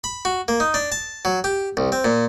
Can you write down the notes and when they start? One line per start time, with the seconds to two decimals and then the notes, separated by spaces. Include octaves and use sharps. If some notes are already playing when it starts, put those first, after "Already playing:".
0.04 B5
0.25 F#4
0.48 A#3
0.60 D#4
0.74 D4
0.92 A5
1.25 F#3
1.44 G4
1.77 C2
1.92 C4
2.04 A#2